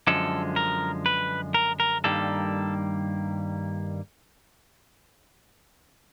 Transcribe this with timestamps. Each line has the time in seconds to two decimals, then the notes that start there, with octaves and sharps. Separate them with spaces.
0.07 F#2 D3 F3 G#3 A4
0.56 A#4
1.06 B4
1.54 A#4
1.80 A#4
2.04 G2 D#3 G3 A#3 A4